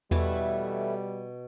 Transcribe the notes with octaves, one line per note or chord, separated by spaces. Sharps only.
E2 B2 E3 G3 A3 E4